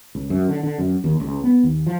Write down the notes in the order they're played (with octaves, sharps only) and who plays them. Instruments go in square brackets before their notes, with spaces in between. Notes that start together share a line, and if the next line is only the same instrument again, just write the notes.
[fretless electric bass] C#2
F#2
D3
D3
F#2
D#2
C#2
B3
D#2
F3